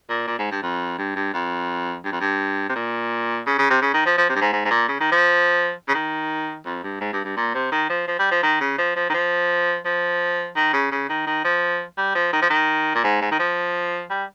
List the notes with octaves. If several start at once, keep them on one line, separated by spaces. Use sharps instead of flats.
A#2
A#2
G#2
G2
F2
G2
G2
F2
G2
F2
G2
C3
A#2
C#3
C#3
C3
C#3
D#3
F3
F3
C3
G2
G#2
G#2
G#2
A#2
C#3
D#3
F3
C#3
D#3
F2
G2
G#2
G2
G2
A#2
C3
D#3
F3
F3
G3
F3
D#3
C#3
F3
F3
D#3
F3
F3
D#3
C#3
C#3
D#3
D#3
F3
G3
F3
D#3
F3
D#3
A#2
G#2
G#2
D#3
F3
G3